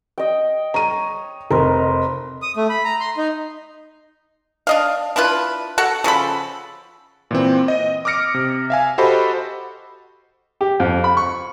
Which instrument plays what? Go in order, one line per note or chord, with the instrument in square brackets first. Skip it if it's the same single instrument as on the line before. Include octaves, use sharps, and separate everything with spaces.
[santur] D#5 G5
[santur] C#5 [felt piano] A#5 D#7
[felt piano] F1 [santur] A#4 C5
[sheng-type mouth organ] D#6
A3
B5
A#5
C6
D#4
[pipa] D4 D#5 F5
D4 E4 F4 B4
F#4 A4 F#5
C#3 F3 A4 B5
[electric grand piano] A#2 E3 C4
D#5
D6 D#6 F6 A#6 C#7 D7
C3
E5 F5 G#5
F#4 G4 A4 C5 D#5 B5
[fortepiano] G4
F2
B5
C#6